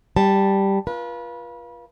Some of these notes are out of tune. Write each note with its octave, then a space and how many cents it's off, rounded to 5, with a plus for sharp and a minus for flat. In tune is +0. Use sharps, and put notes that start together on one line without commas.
G3 +0 A5 +0
F4 -10 B4 -35